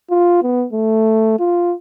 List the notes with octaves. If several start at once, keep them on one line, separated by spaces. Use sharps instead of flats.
F4
B3
A3
F4